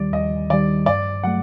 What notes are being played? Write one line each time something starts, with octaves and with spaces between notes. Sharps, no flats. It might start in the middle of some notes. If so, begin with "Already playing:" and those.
Already playing: D#2 D#3 G3 D5
D#2 D#5
D#3 G3 D5
G2 D5
F#3 A3 F#5